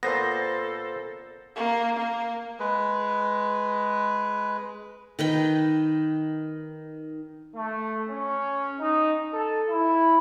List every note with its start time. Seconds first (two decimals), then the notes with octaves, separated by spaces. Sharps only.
0.03 A#2 B3 A4 C5 A#6
1.56 A#3
1.97 A#3
2.59 G#3 B4
5.19 D#3 B4 G5
7.55 A3
8.08 C#4
8.80 D#4
9.33 A4
9.69 E4